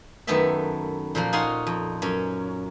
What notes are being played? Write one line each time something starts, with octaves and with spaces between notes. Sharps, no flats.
F#2 D#3 A3 B3 A4 E5
A#2 F3 A#3
D#4 F4 C#5 F#5 G#5 C6
F2
F#2 C#4